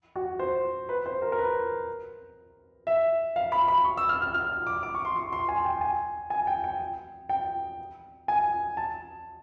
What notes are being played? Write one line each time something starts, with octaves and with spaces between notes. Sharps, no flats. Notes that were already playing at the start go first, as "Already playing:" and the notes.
F#4
C5
B4
C5
A#4
A#4
B4
E5
F5
B5
B5
C#6
E6
F6
F6
F6
D6
D6
C#6
C6
C#6
C6
G#5
G5
G#5
G#5
G5
G5
G5
G#5
A5